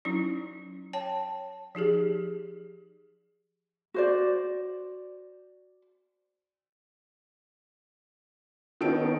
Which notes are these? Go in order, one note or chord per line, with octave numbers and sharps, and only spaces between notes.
F#3 C#4 D#4 E4
C#5 G5 A5
F3 D#4 G4 G#4
F#4 C5 D5
D#3 B3 C#4 D#4 A4 D7